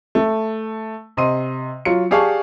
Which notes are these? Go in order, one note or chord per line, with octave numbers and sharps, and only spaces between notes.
A3
C3 D#5 C6 D#7
F#3 F4 C#7
G4 G#4 D5 F5 A5 C#6